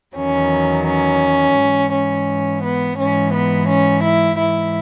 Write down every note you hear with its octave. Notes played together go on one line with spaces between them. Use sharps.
E2 D#3 F#3 C#4
C#4
G#2 E3
C#4
B3
G#2 E3 C#4
B3
C#4
E4
G#2 E3 E4